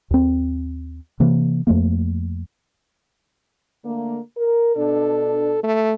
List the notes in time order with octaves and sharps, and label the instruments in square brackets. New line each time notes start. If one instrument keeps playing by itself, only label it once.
[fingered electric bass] D#2 C4
C3 E3 A#3
F2 F3 A3 A#3
[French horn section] D3 A3 A#3
A#4
[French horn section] B2 D4 [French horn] A4
[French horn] A3